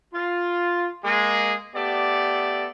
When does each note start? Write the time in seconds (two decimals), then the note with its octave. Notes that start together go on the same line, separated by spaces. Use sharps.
0.14 F4
1.05 G#3 A#3 G#4
1.76 A3 B3 G4 A4 D5